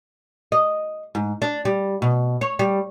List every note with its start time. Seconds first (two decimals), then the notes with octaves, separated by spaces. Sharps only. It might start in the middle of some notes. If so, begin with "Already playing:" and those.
0.52 D#5
1.15 G#2
1.42 D4
1.65 G3
2.02 B2
2.41 C#5
2.59 G3